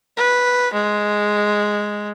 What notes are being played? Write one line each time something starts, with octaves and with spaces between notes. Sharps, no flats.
B4
G#3